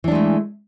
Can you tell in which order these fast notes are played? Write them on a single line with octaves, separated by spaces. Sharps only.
E3 D4 G#3 A3